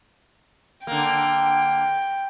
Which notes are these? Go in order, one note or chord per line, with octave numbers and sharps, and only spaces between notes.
D3 A#3 G5